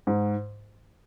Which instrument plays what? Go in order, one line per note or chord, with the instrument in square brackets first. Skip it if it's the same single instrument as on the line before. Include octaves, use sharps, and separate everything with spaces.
[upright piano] G#2